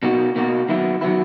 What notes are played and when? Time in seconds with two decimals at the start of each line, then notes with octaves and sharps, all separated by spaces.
0.03 B2 A#3 D#4 F#4
0.36 B2 A#3 D#4 F#4
0.69 D#3 F#3 B3 E4
1.01 D#3 F#3 B3 E4